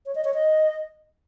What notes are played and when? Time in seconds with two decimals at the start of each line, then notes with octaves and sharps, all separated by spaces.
0.06 C#5
0.15 D#5
0.25 C#5
0.34 D#5